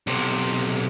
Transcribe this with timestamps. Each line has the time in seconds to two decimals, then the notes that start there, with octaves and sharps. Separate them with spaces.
0.07 B1 C3